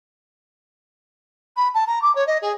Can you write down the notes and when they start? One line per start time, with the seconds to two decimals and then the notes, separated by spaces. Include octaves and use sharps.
1.56 B5
1.74 A5
1.87 A#5
2.02 D6
2.15 C#5
2.27 D#5
2.42 G#4